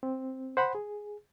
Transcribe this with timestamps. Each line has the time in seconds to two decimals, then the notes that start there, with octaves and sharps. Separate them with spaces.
0.03 C4
0.57 C5 F#5 B5 C6
0.75 G#4